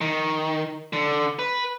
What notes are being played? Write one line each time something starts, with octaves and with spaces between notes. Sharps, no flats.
D#3
D3
B4